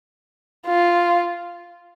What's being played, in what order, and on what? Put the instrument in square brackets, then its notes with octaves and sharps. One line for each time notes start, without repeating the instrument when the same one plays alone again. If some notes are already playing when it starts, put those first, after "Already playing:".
[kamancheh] F4